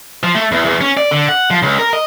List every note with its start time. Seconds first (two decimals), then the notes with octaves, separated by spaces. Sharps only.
0.23 F3
0.35 A3
0.52 E2
0.65 E2
0.81 C#4
0.97 D5
1.11 D3
1.28 F#5
1.51 F3
1.63 C#2
1.79 A#4
1.93 D#5